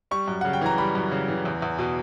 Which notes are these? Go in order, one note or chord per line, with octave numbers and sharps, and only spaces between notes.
G3 C#6
F#2
C#3 F#5
G5
E3 A#5
G3 B5
F#2
C#3
E3
E2
E2
B2